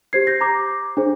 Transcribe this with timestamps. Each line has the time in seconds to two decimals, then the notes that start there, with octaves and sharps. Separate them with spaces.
0.13 G4 C5 G#6 C7
0.27 G6 A#6
0.41 A#5 D6
0.97 D4 G#4 C5